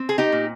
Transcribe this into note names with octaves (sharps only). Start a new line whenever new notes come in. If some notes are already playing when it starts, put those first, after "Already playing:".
Already playing: C4
G#4
D#4 G4
A#2